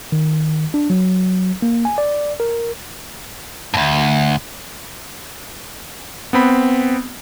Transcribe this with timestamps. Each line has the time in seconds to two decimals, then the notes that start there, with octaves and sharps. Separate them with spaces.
0.12 D#3
0.74 D4
0.90 F#3
1.62 A#3
1.85 G#5
1.98 D5
2.40 A#4
3.74 D2 G2
6.33 B3 C4 B5